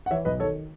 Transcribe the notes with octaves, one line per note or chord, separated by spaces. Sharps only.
F#5
E3 C#5 E5
B1 B4 D#5
D#3 A4 C#5